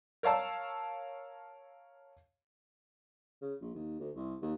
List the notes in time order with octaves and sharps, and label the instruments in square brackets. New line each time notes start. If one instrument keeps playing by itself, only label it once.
[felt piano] A#4 C#5 F5 A5 E6
[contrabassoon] C#3
A#1
D#2
D2
C2
D#2